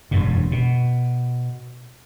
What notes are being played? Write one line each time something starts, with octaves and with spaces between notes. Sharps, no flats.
E1 F#2 A#2
B2